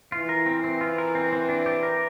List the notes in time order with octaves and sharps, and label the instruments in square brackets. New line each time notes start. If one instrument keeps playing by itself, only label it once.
[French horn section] E3 [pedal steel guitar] F4
[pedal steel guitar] A#4
C4
C4
F4
A#4
C4
C4
D4
G4
A#4